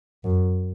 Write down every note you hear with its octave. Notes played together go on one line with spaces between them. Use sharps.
F#2